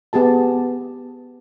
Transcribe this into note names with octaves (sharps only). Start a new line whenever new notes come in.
B3 G4 G#4 A5